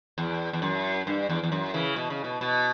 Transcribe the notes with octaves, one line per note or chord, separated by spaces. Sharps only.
E2
E2
F#2
G2
E2
E2
F#2
C#3 E3
B2
C#3
B2
B2